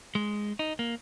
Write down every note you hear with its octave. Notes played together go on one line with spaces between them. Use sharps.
G#3
D#4
A#3